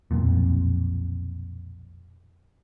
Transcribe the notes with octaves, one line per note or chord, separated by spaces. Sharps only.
B1 F2 A#2